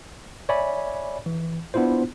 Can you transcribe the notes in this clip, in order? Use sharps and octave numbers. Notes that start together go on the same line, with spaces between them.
C#5 D5 E5 G#5 B5
E3
B3 D4 E4 F4 C5